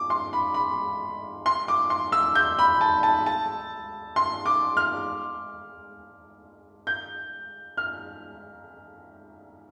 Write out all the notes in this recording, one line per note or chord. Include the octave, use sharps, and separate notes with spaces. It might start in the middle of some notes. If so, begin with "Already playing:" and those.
Already playing: D6
C6
B5
B5
C6
D6
C6
E6
G6
B5
A5
A5
A5
C6
D6
F6
G6
F6